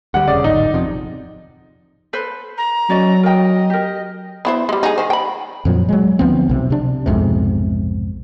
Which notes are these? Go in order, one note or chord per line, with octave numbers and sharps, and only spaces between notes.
D2 G3 F#5
E1 C#3 D5
D1 G#1 D#4
F2 C3 F3
A4 B4 C5
A#5
F#3 C#4 D5 D#5
A#4 D#5 G5
G4 A#4
B3 E4 C5
G3 G#3
D#4 G#4
D#3 C5
G5 B5
F2 A#2 F3 F#3
F#3 G#3
D2 F3 B3 C4
B1 C3
C3 D4
B1 F2 G#2 C3